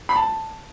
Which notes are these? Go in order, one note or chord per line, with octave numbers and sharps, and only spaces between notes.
B5
A5